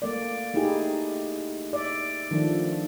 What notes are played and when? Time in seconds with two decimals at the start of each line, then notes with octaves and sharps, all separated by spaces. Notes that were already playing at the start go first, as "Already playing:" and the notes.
0.02 A3 A#3 D5
0.54 A3 D#4 E4 G4 G#4
1.73 D5 E5
2.31 D#3 F3 A3 D4